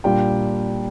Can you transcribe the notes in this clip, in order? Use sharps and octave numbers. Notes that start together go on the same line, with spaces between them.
A#2 G3 D4 F4 G5